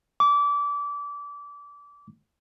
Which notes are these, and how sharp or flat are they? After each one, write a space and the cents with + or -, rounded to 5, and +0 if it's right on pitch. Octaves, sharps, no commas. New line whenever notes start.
D6 -25